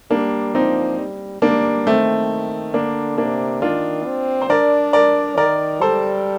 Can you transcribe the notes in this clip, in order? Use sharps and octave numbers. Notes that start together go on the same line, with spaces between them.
G3 A#3 D4
F3 C4 D#4
G3
G3 A#3 D4
D#3 A3 C4
D3 A#3 D4
C3 A#3 D4
D#3 D4 F4
C4
C5
D4 A#4 D5
A#4 D5
D#3 A#4 D5
G3 A4 C5